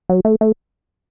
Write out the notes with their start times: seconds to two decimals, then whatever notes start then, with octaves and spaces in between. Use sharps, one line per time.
0.09 F#3
0.25 A3
0.41 A3